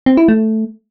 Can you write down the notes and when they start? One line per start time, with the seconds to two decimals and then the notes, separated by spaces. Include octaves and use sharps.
0.06 C4
0.17 E4
0.28 A3